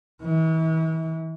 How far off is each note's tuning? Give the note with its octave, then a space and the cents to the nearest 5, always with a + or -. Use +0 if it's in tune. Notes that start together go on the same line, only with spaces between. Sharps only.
E3 -40